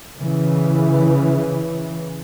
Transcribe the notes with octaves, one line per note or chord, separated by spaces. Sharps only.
C#3 E3